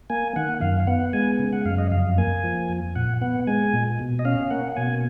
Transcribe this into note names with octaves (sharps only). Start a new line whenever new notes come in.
A#3 G#5
D#3 F#5
F#2 F5
F5
B3 F#5
G#3 G#5
C#3
F#5
F#2 F5
D#5
F2 F5
A#3 G#5
F3
F2
A#2 F#5
B3 F#5
G#3 G#5
A#2
B2
D#5
C#4 F5
A#3 F#5
F#5
B2 G#5